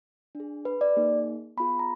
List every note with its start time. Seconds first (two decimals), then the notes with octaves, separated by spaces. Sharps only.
0.35 D4
0.40 G#4
0.65 B4
0.81 D5
0.96 A#3 D#4 G#4
1.57 B3 F4 G#4 B5
1.79 A#5